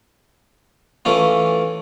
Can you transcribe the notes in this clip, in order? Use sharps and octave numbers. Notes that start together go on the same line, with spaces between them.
E3 A3 C#4 F4